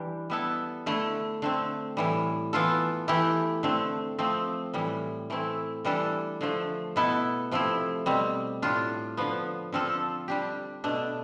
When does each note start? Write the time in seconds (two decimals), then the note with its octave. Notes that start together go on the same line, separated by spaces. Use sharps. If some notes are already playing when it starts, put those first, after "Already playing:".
Already playing: E3 G3 D4 G4
0.30 G3 B3 E4 A4
0.86 D3 A3 E4
1.42 D3 A3 C4
1.97 A2 E3 G3
2.53 E3 B3 F4 A4
3.08 E3 A3 E4 G4
3.63 D3 A3 C4
4.18 F3 A3 C4
4.74 A2 E3 G3
5.30 E3 A3 C4 E4
5.85 E3 G3 D4 A4
6.41 D3 F3 A3
6.96 B2 B3 E4 A4
7.51 C3 F3 A3 E4
8.06 B2 G3 C4
8.62 A2 G3 D4 F4
9.17 D3 F3 B3
9.72 D3 F3 C4 F4 A4
10.28 G3 D4 G4
10.84 B2 A3 D4